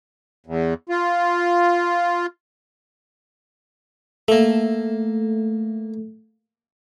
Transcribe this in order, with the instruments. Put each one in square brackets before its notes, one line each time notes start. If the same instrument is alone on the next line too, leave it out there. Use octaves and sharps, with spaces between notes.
[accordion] E2
F4
[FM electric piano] A3 [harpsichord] A#3 E5